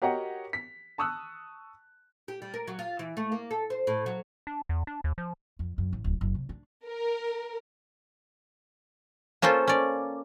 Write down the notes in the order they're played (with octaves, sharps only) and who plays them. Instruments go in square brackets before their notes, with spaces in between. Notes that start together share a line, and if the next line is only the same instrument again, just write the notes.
[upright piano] F#4 G4 A#4 C#5 D#5 F#5
B6
A5 C#6 D#6 E6 F#6
[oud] G4
G3
A#4
F#3
F4
E3
A3
A#3
A4
C5
A2
F#3
[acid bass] D4
E2
D4
D#2
F3
[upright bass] F2
F#2
A1
D1
F#1
C3
D4
[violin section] A#4
[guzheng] A#3 C#4 F4 A4 C5
C#4 D5